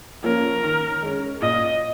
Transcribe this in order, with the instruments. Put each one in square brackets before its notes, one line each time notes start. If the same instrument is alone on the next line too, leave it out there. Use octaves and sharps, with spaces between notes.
[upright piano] F3 A#3 C#4 [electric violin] A#4
[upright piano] D#3
G#3 C#4
[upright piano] A#2 [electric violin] D#5